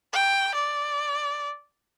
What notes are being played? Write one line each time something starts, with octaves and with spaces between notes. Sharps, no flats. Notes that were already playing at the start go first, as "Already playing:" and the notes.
G5
D5